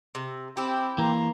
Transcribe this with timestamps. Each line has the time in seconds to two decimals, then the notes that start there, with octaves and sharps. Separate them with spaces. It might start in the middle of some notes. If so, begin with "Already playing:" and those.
0.15 C3
0.57 C4 E4 G4
0.98 E3 A#3 A#5 C6